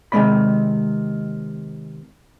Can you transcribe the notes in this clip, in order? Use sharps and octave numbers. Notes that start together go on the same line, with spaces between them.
C3 D#3 G#3 A3 D5 B5